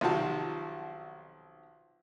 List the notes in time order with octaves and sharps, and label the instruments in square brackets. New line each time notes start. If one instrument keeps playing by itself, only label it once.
[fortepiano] B1 C3 D#3 F3 F#4 A5